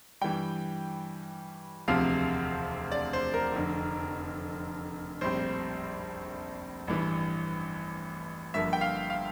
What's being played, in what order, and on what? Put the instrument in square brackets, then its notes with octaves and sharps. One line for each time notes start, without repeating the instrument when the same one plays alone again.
[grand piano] G2 E3 G3 G5
E1 D2 C3 F3 C4 F5
D5
C5
A#4
F1 F2 D3
A#1 A2 G3 C4 C5
A1 G2 E3
G1 G2 F3 A#3 E5
G5
F5
F5